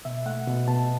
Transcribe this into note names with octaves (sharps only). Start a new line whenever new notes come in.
B2 E5
A3 F#5
B2
B2 A5